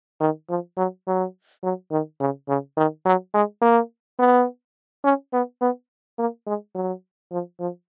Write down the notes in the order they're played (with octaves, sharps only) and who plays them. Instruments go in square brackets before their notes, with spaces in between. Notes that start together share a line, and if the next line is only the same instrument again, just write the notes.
[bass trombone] D#3
F3
F#3
F#3
F#3
D#3
C#3
C#3
D#3
F#3
G#3
A#3
B3
C#4
B3
B3
A#3
G#3
F#3
F3
F3